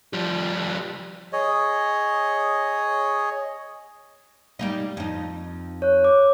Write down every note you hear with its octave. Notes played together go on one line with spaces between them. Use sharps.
F3 G3
G#4 C#5 D#5
G3 A#3 D#4
F2 D#4
C#5 F#6
D6